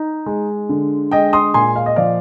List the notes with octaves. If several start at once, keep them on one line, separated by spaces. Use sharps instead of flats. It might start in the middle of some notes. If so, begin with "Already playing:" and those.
Already playing: D#4
G#3
D3
G#3 D#5 G5
C6 D#6
A#2 G#5 C6
F5
D#5
F3 D5 F5